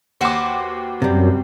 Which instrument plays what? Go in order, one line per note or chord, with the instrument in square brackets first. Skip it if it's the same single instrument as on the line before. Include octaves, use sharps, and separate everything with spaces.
[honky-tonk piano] D#2 D6 [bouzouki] F#4 B4 C5
[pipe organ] F#2 [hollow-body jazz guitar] C3 G3